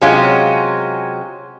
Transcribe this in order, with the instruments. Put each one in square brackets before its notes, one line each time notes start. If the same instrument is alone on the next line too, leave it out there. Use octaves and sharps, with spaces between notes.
[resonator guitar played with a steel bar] C3 F#3 G#3 C#4 F4